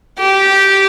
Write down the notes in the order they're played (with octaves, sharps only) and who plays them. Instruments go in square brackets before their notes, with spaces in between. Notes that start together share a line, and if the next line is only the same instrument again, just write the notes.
[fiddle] G4